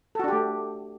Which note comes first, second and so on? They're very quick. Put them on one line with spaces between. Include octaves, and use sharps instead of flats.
A4 F#4 D4 G4 A3